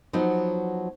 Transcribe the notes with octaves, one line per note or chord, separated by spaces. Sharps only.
F3 F#3 B3 D#4